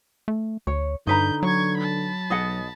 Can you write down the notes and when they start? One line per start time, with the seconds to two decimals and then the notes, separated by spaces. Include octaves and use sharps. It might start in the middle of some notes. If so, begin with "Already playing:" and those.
0.28 A3
0.67 D2 C#5
1.07 G2 D3 D#4 B4 A#5 G6
1.43 F#3 C#6 G#6
1.77 A5 B5
2.30 B1 G#4 D#5 F#5